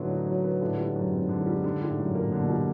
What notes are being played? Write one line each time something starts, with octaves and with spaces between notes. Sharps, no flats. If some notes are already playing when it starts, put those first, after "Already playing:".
Already playing: A2 D3 D#3 F#3 B3
D#4
F#3
B3
A2 D3
G3
G#2
F#2
G#2 C4
D3
G#2
G3
G#2 D3
G#2 G3
A2
F#2
A#2 A#3
D3
B2
G3